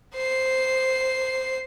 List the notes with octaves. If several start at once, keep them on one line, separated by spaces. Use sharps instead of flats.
C5 C7